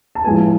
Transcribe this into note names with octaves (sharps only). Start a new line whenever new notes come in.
A5
A2 F3 G#3 B3 G#5